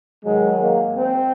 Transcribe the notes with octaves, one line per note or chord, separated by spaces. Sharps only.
G#2 D#3 F#3 G#3
A#3
C4